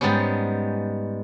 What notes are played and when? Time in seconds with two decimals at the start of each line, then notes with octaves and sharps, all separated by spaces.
0.01 G#2 G3 G#3 B3 C#4